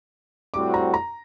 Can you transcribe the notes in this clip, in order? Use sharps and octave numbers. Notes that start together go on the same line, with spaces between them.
A2 G3 C4 F#4 C5 D6
A#5
A#5